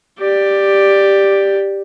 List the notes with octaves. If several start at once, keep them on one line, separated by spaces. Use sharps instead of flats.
G4 D5